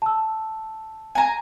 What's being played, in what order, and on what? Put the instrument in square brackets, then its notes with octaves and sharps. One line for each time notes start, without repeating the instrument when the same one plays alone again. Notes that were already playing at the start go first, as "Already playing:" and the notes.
[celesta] A5 E6
[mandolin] G#5 A#5